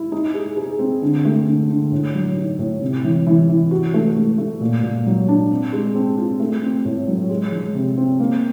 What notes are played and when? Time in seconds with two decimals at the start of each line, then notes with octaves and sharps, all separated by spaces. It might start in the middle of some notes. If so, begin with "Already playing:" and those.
Already playing: E4
0.12 D#4
0.34 G#4
0.57 G#4
0.79 C4
1.02 D3
1.25 A3
1.46 D3
1.70 D3
1.92 A2
2.14 F#3
2.37 D#4
2.59 A2
2.81 C3
3.04 E3
3.27 E3
3.49 E3
3.71 F#4
3.94 A3
4.16 A3
4.38 A3
4.61 A#2
4.83 A#2
5.06 F#3
5.28 D4
5.51 C4
5.73 G#3
5.95 C4
6.17 F4
6.40 A3
6.63 C4
6.85 A2
7.08 F#3
7.29 G#3
7.52 F3
7.75 C3
7.97 C4
8.20 A#3